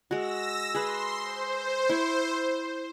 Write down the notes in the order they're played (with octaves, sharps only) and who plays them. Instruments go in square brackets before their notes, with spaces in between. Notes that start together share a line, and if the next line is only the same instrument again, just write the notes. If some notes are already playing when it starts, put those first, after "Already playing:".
[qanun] G#3 F#4 [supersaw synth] E6 A#6
[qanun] G#4 B4 [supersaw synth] C6
[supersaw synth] C5
[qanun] E4 C#6